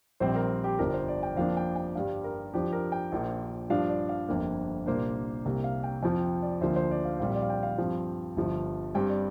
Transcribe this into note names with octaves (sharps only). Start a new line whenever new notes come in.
A#1 A#2 G3 C4 C5
A#4
G4
G1 F2 F3 D4 A#4
C5
D5
G5
F2 F3 A#3 D4 F5
G5
G5
G2 G3 D4 F5
A#4
F2 F3 D4 G4
A#4
G5
A#1 A#2 F3 A#3
G2 F3 D4 F5
D5
F5
G1 F2 D3 A#3
C2 A#2 A#3 D4 C5
C2 C3 A#3
F5
G5
F2 F3 C4 G5
D5
D2 D3 F3 A#3 D4 C5
C5
D5
F5
A#1 A#2 G3 C4 F5
D5
F5
G5
F5
G2 F3 C4
G1 G2 F3
G2 G3 C4 G5
D5